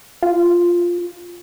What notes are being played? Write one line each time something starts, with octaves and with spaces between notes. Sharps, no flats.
F4